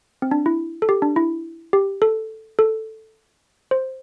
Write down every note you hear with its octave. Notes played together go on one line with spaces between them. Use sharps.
C4
D4
E4
A4
G4
D4
E4
G4
A4
A4
C5